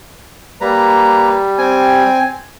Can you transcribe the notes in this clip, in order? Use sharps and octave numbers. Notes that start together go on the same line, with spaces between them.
G3 A#3 B4 A#5
C4 G#5